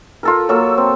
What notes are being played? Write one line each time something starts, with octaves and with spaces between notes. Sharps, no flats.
F4 A4 A#4
F#3 A#3 A4 E6
C4